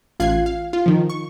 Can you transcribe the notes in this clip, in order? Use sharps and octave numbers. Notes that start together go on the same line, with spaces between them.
A1 F4 F5 F#6 G#6 C7
F5
F4
D#3 F3
C#6